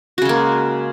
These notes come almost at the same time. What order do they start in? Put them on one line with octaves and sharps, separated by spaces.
F#4 C#3 G#3 A#3